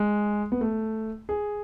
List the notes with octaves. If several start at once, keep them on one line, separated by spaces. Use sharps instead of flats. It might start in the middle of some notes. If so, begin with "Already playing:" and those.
Already playing: G#3
B3
A3
G#4